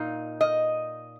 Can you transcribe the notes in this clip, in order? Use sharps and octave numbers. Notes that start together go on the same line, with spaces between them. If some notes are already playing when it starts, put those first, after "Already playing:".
Already playing: A#2 D#4 F5
D#5